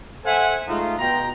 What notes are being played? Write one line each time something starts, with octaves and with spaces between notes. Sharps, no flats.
A4 C5 E5 F#5 G#5
G#3 A3 D#4 F4
B2 G5 A#5